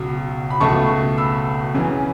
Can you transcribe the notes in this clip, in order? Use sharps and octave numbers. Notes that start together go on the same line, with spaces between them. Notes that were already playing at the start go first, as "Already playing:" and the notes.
Already playing: C#2 B2 F#3
B5
C#2 B2 A3 A5 C#6
B5 E6
F#2 C#3 E3 C#4